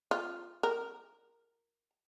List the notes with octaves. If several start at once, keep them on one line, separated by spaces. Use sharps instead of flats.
F4
A#4